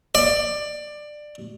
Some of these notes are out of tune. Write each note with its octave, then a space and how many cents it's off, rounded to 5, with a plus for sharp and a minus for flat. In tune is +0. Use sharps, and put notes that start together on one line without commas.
D5 +15